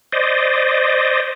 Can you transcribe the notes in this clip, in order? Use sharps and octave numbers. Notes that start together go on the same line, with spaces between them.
C5 D5 D#5